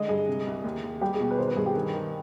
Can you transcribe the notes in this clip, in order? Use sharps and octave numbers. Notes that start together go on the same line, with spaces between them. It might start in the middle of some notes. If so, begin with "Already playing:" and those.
Already playing: D3 G#3 D#5
G2 G#4
C3
C2
D#2
D#2
G3 G4
G#4
B2
B4
D#3 C5
B4
G2 G#4
G4
D#3
D#3